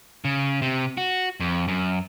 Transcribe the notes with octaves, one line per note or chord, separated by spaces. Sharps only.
C#3
C3
F#4
F2
F#2